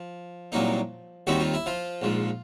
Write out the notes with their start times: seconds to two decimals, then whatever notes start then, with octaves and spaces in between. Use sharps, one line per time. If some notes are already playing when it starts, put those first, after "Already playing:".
Already playing: F3
0.52 C2 A#2 F#3 A#3 D#4
1.27 D#2 D#3 G3 C4 D#4 F#4
1.40 F4
1.54 E4
1.66 F3 F4
2.02 A#1 G#2 F3